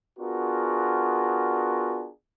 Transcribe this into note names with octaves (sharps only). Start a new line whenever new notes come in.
B3 D4 F4 F#4 G#4 A#4